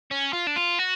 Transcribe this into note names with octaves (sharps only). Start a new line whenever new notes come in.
C#4
F4
D4
F4
F#4